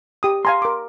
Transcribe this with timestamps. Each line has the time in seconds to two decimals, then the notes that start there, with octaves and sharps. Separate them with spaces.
0.23 G4 D#6
0.45 F5 G#5 A#5 C6
0.62 A#4 D6